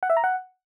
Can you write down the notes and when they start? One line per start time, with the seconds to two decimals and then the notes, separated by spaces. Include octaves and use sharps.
0.03 F#5
0.10 E5
0.17 A#5
0.24 F#5